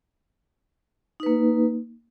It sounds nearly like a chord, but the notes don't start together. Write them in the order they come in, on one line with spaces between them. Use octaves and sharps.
D#4 B4 A#3